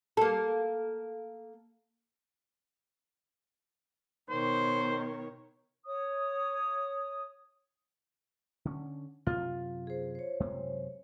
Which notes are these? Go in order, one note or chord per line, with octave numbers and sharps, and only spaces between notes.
A#3 A4
B2 D#3 C5 C#5
C#5 D#6
D3 C#4
F#2 C3 F4
G#4 C5
C5 C#5
F#2 C3 G#3